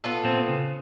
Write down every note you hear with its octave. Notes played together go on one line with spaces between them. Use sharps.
B3 F4 A4
A#2 C4
C#3